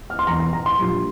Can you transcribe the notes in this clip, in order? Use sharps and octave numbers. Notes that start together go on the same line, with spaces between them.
F6
C6
E1 E2 E3 A#5
A#5
A#5
C6
A#1 A#2 G3